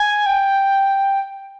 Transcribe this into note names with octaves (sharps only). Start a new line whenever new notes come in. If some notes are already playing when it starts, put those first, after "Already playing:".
Already playing: G#5
G5